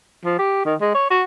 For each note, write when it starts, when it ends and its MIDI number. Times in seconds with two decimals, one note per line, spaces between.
0.24 0.35 53
0.39 0.60 67
0.65 0.75 51
0.81 0.90 56
0.95 1.08 73
1.10 1.24 66